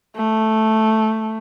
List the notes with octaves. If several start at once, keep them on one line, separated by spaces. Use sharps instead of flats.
A3